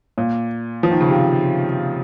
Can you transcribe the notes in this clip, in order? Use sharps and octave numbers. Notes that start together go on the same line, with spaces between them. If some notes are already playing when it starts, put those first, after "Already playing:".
A#2
F3
D#3
C#3
C3